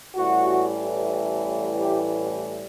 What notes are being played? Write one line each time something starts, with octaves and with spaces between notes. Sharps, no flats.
A1 A2 E3 G3 F#4
G4